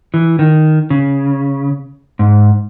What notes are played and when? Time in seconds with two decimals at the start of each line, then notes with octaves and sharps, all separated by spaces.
0.14 E3
0.39 D#3
0.90 C#3
2.19 G#2